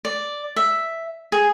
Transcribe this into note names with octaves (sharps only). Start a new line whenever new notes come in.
D5
E5
G#4